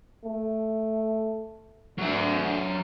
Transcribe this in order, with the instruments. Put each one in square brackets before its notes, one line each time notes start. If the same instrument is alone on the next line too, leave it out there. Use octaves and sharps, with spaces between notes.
[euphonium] A3
[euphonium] D2 [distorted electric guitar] F#3 E5